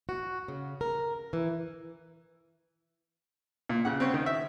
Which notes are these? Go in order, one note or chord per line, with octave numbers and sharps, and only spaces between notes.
F#4
C#3
A#4
E3
A#2
C#3 F#5
C4 C#4
D#3
E5